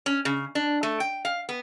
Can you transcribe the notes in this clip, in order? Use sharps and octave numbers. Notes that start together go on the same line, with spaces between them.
C#4
C#3
D4
A3
G5
F5
B3